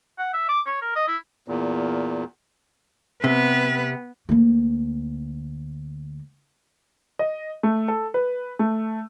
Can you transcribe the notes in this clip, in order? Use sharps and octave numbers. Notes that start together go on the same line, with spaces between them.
F#5
E5
D6
C#5
A#4
D#5
E4
E2 A#2
C3 B3 B4
D2 A#3
D#5
A3
A4
B4
A3